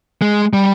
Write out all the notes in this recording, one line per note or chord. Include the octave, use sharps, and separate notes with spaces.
G#3
G3